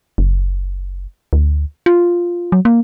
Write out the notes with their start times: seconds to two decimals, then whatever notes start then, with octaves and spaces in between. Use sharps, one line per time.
0.18 F#1
1.33 D2
1.86 F4
2.52 F#3
2.65 A#3